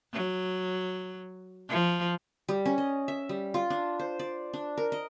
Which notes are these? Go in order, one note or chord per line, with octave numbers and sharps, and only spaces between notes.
F#3
F3
G3
C#4
D#5
E5
G3
F4
D4
C5
D5
D4
A#4
D#5